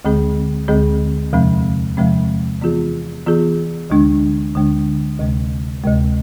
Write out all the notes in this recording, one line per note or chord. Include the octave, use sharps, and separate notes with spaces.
D2 D3 G#3 C4 G#4
D2 D3 G#3 C4 G#4
E2 C3 F3 G#3 C4
E2 C3 F3 G#3 C4
E3 B3 F4 G#4
E3 B3 F4 G#4
D2 D3 G#3 D4
D2 D3 G#3 D4
D2 C3 G#3
D2 C3 G#3